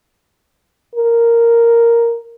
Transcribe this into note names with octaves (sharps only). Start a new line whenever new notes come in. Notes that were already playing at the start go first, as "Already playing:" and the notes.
A#4